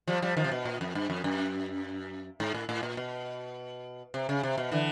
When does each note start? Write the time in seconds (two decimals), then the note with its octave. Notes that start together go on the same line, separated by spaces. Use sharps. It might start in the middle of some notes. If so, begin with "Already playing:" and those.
0.07 F3 G3
0.22 F3 G3
0.37 D#3 F3
0.44 C3
0.52 B2
0.65 A#2
0.81 F2
0.95 G2
1.10 F2
1.24 F#2
2.40 G#2
2.54 A2
2.69 A2
2.83 A#2
2.97 B2
4.14 C3
4.29 C#3
4.43 C3
4.58 B2
4.72 D3 E3